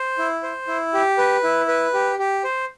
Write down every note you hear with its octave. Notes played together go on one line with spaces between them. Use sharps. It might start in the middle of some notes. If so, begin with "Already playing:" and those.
Already playing: C5
E4
C5
E4
G4
B4
E4
B4
G4
G4
C5